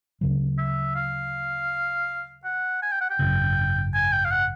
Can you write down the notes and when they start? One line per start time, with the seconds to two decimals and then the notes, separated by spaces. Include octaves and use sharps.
0.21 D2 C#3 F#3
0.58 E5
0.96 F5
2.44 F#5
2.82 G#5
2.92 G5
3.01 F#5
3.10 G5
3.19 G#1 F#2 C#3
3.94 G#5
4.12 G5
4.25 F5
4.31 F#5